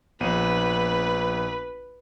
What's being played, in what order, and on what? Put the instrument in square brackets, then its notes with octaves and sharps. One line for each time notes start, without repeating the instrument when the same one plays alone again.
[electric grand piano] A#1 B3 D#7 [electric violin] B4